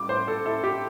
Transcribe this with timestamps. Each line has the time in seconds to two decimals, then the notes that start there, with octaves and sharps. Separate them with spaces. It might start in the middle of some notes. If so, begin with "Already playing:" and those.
Already playing: G3 D6
0.09 A2 C5
0.28 A4
0.46 E4 A4
0.64 G4